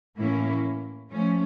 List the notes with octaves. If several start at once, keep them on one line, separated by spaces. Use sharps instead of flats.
A2 E3 A#3 C#4 E4
F3 A3 C#4